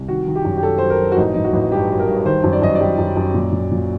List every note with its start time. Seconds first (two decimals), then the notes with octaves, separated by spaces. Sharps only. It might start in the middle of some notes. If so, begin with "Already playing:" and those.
Already playing: C2
0.08 D#3 F#4
0.27 D#3
0.35 G4
0.45 F#2
0.57 G4
0.63 F#3 A4
0.78 F#3 C5
0.90 A#4
1.00 F#3
1.12 F#4
1.17 A1 D#4
1.34 A1 D#4
1.44 F#4
1.53 A1
1.72 G2 G4
1.90 F#3
1.99 A#4
2.08 G2
2.25 D#3 C5
2.44 F#2
2.53 D5
2.62 F#2 D#5
2.75 D5
2.81 G3
2.98 F#2
3.17 F#2
3.34 A#2
3.52 A#2
3.71 A#2